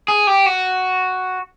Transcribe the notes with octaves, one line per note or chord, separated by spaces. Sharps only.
G#4
G4
F#4